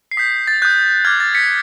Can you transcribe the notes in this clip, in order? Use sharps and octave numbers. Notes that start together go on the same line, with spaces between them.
C7
D#6 G6 B6
A6
D#6 F#6 G6
D6 F6 G#6
A6
B6 C#7